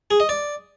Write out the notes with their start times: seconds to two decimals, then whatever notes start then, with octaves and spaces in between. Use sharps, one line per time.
0.11 G#4
0.20 D#5
0.29 D5